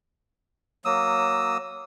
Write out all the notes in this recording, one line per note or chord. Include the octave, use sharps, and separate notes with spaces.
F#3 A#3 D#6 E6